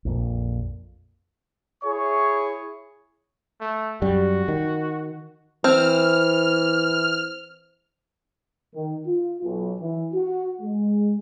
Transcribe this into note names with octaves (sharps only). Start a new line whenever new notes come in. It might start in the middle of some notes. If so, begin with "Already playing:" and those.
A#1 F2 A#2
E4 G#4 C#5 C#6
A3
F#2 G3 F#4
D#3
E3 C4 F6
D#3
F4
B1
E3
F#4
G#3